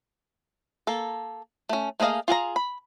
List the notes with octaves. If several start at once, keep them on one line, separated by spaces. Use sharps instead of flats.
A#3 A4
A3 C#4
A3 A#3 G#4 D#5 F5
F4 G#4 A5 A#5
B5